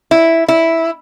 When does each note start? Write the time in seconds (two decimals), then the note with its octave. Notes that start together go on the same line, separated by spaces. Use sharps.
0.11 E4
0.48 E4